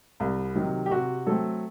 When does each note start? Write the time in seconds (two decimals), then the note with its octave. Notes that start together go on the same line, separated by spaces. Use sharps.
0.20 C2
0.55 C3 D#3 F#3
0.86 G4
0.91 C3 F#4
1.27 F#3 A3 C4 A4